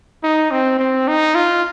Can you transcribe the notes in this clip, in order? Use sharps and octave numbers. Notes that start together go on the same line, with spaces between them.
D#4
C4
C4
D#4
F4